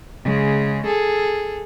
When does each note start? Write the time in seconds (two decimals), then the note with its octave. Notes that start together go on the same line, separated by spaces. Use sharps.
0.23 C#3 G#3
0.86 G#4 A4